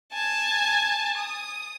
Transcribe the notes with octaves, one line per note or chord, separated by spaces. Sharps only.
G#5 A5
D#6